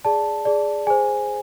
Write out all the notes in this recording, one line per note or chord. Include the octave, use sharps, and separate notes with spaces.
G#4 D5 A5
G#4 D5
G#4 C5 G#5